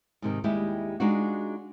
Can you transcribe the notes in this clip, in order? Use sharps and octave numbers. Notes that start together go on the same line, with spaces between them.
G#2 C3 D#3
D#2 G3 G#3 E4 G4
G#3 D4 D#4 F4 F#4